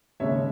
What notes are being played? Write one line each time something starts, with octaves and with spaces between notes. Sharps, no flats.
D#2 C#3 G#3 C#5 E5